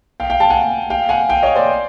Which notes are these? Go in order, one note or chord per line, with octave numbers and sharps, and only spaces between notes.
F5 G5
F5 G5
G5 A5
F#5 G#5
F5 G5
F#5 G#5
F5 G5
C#5 D#5
C5 D5